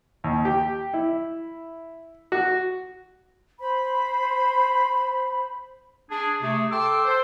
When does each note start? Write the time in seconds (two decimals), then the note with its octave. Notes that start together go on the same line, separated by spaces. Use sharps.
0.24 D#2
0.45 G4
0.94 E4
2.32 F#4
3.59 C5 B5
6.10 D4 G#4
6.41 C3 A3 G#4
6.71 A4 G5 A5 C6 D6 E6
7.05 C5